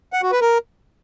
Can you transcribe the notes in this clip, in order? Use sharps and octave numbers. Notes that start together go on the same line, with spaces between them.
F#5
F#4
B4
A#4